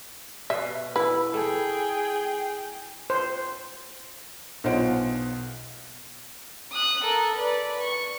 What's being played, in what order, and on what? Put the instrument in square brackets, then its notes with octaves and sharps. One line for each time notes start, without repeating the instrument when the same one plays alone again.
[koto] B2 [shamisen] E5
[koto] E4 [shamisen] B4
[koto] A3 [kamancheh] G#4 G5
[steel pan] C5
[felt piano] B1 B2 F4 C5 F#5 D7
[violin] D#6 F#6
A4 A#4
B4 D5
C#6